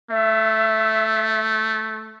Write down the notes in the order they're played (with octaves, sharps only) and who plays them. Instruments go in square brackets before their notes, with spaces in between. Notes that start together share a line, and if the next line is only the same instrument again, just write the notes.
[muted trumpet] A3 [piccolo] E5